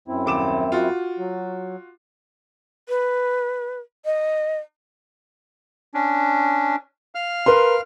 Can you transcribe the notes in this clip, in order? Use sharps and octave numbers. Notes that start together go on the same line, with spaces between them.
F#2 C4 E4
D#1 D6 E7
F4 F#4
F#3
B4
D#5
C#4 D4
F5 F6
A#4 B4 C6